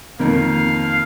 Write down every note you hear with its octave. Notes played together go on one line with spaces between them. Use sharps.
F2 D#3 A#3 F5